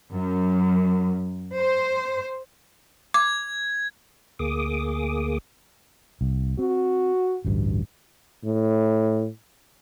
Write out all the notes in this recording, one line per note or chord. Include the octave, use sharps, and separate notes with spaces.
F#2
C5
D6 G#6
D2 A#3 G#4 D6 D#6
C2
C4 F#4
A1 D2 G2
A2